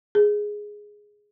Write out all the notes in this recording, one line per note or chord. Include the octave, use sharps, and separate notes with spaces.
G#4